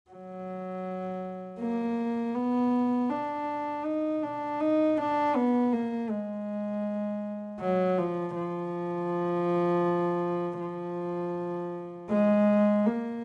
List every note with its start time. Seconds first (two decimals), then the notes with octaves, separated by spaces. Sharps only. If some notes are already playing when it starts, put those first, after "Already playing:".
0.10 F#3
1.60 A#3
2.35 B3
3.10 D4
3.85 D#4
4.23 D4
4.60 D#4
4.98 D4
5.35 B3
5.73 A#3
6.10 G#3
7.60 F#3
7.98 F3
8.36 F3
10.60 F3
12.10 G#3
12.86 A#3